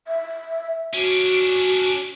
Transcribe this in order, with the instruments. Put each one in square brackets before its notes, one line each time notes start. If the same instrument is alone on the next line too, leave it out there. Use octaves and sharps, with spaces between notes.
[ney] E5
[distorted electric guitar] C#4 D4 [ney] F#4